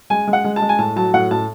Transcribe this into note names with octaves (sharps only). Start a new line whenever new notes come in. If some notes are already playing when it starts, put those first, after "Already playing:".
G#3 G#5
G#3
F#5
G#3
A5
G#3
G#5
A2 A5
F#3 A5
A2 F#5
A2 A5